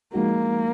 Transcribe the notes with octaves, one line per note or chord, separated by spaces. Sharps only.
F3 G#3 A#3 D#4 F#4